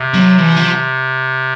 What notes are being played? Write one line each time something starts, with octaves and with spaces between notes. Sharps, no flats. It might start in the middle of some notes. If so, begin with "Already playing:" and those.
Already playing: C3
F#3
E3
F3